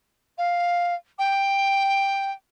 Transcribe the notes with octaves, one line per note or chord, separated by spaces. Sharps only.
F5
G5